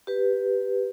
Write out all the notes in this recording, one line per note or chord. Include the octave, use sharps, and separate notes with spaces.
G4 B4